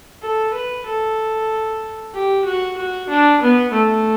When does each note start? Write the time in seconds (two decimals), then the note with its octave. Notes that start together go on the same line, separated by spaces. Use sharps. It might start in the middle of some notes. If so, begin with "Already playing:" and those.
0.22 A4
0.53 B4
0.86 A4
2.14 G4
2.45 F#4
2.77 F#4
3.09 D4
3.42 B3
3.73 A3